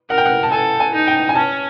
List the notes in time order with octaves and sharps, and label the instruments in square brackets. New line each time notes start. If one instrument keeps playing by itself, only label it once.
[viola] A#4 [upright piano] F#5
[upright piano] G5
F#5
A5
[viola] A4 [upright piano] G#5
[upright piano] G#5
[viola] D#4
[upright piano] G5
G#5
[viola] C#4 [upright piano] A5